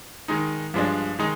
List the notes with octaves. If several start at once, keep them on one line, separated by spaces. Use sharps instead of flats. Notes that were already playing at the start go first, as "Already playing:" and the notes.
D#3 G#3 D#4
G2 F3 G#3 D4
D#3 G#3 D#4